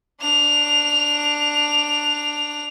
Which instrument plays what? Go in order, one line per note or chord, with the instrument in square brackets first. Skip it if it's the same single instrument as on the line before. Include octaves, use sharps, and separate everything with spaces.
[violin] D4 F7